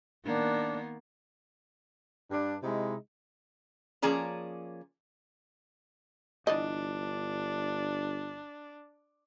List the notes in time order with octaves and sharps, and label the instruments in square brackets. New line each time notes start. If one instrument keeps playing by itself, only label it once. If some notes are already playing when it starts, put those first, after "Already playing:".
[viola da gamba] D#3 A#3 B3 [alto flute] D4
[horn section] G2 D4
C3 G#3 D#4 E4
[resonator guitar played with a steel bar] F3 A#3 C#4 G#4 D5 A#5
[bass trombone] G1 [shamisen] E3 D5 D#5 [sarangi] D4